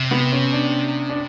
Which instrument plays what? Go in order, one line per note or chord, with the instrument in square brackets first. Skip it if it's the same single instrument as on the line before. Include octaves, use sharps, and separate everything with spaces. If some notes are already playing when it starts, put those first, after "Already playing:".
Already playing: [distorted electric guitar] C3
[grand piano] B3
C#4
D4
D4